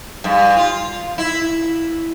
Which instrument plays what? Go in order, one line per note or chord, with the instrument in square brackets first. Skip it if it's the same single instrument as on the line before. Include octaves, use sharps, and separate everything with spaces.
[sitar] G2
F4
E4